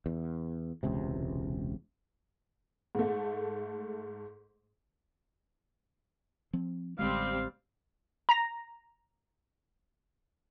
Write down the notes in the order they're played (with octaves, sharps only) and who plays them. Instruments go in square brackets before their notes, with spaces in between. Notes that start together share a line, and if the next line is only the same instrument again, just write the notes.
[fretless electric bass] E2
E1 C#2 C3
[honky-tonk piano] G#2 A3
[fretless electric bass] F3 C4
[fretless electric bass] A1 D3 G#3 [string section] G3 C4 [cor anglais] F5
[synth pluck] A#5 A#6